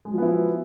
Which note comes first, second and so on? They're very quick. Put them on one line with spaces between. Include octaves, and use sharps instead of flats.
G#3 F#3 F3 B3 E4